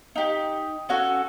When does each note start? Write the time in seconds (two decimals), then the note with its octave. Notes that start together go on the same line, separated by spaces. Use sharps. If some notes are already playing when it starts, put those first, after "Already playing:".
0.15 D#4 G4
0.89 C#4 F#4 A4